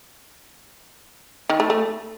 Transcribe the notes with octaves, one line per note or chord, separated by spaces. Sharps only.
D#3
A3
A3